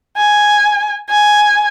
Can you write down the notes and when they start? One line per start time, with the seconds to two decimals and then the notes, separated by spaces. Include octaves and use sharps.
0.17 G#5
1.09 G#5